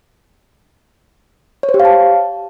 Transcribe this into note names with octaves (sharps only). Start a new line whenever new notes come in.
C#5
C5
G4
F5
A5